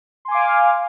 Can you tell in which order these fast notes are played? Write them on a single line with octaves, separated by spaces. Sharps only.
C6 G#5 D6 F5